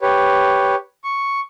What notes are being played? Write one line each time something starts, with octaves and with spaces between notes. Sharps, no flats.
G4 B4 C#5
C#6